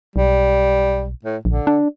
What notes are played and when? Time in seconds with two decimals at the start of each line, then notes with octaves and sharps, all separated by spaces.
0.16 B1 G3
1.24 A2
1.45 A#1 D3
1.67 D4